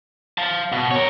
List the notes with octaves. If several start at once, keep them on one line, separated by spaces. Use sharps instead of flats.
F5 A5
B2
A#4 C#5